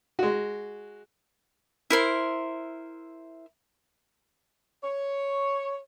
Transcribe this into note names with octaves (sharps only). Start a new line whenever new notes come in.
G#3 F#4
E4 A#4 C5
C#5